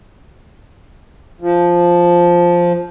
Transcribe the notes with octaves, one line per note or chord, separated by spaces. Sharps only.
F3